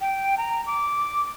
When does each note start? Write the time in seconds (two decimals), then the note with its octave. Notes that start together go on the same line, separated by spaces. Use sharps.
0.01 G5
0.38 A#5
0.67 D6